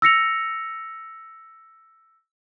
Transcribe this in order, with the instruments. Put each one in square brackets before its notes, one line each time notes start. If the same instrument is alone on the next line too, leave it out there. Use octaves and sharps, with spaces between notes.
[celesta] E6 A#6 C#7 F7